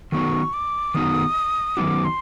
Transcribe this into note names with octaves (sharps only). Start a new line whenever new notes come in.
D#3 F#3 B3 D#4 F#4 C#6
D6
D#3 F#3 B3 D#4 F#4 D#6
D#3 F#3 B3 D#4 F#4 D6
C6